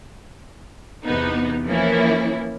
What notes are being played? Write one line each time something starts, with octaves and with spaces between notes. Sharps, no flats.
E2 C3 B3 D#4
E3 F3 A#3 C#4 E4